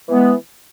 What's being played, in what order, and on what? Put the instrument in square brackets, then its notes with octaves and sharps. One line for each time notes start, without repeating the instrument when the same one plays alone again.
[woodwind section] E3 G#3 B3